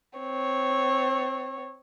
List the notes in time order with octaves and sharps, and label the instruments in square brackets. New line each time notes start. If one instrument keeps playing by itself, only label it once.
[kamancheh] C4 C#5